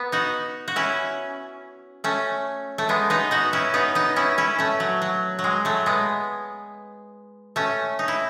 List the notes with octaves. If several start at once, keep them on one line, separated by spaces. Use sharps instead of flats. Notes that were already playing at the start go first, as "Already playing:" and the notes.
Already playing: B3
D#4 F#4
F#4
C#4 E4
A3 C#4
A3
G#3 B3
B3 D#4
D#4 F#4
C#4 E4
B3 D#4
B3 D#4
C#4 E4
C#4 E4
A3 C#4
F#3
F#3
F#3
G#3
F#3 A3
G#3 B3
A3 C#4
D#4
E4